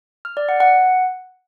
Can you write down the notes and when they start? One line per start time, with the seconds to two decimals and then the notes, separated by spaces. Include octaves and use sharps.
0.25 F6
0.37 D5
0.49 F#5
0.60 F#5